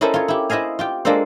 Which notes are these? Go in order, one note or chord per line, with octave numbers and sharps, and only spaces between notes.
C#4 E4 A4 A#4 C5 D#5
F4 C#5
E4 G4
E4 C5 D#5 F5 G#5
F4 G4 G5
G#3 A#3 D4 F4 A4 C5